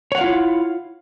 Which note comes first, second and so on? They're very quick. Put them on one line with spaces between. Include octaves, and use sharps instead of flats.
C#5 F#5 F5 F4 E4